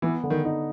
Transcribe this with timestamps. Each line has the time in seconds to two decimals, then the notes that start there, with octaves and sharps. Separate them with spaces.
0.02 E3 B3
0.23 D3
0.30 D#3
0.45 D#4